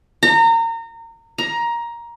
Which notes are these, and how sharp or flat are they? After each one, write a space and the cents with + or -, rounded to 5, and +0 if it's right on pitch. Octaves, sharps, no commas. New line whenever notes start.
A#5 -30
A#5 +15